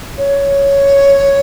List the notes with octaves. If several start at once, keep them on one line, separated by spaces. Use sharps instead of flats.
C#5